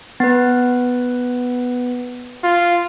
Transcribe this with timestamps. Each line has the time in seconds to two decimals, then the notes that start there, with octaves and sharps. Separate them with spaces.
0.20 B3 B4
2.44 F4